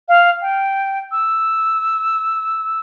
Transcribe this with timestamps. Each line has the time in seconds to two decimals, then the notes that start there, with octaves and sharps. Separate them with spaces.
0.08 F5
0.42 G5
1.12 E6